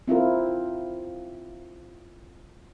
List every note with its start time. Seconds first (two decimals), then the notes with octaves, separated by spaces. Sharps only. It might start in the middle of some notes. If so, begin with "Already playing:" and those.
0.08 C4 E4 F4 A#4